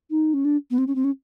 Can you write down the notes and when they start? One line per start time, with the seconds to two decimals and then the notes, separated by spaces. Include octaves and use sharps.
0.11 D#4
0.34 C#4
0.45 D4
0.71 B3
0.78 C4
0.87 C#4
0.95 C4
1.04 C#4